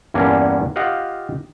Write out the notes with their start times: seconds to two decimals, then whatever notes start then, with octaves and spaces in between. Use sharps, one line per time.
0.14 E2 G2 A#3 C#4 D4
0.76 F4 G4 D#5 F5 F#5